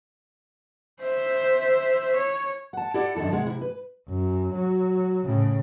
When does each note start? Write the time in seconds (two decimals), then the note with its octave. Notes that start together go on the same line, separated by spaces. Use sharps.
1.01 C5 E5
2.15 C#5
2.73 F#5 A5
2.94 E4 G4 A4 D5 F#5
3.16 F#2 D#3 D4 A4
3.32 D#2 C3 G#3 F#5
3.46 C3 E4
3.61 B4
4.09 F#2
4.54 F#3
5.25 A2 C#3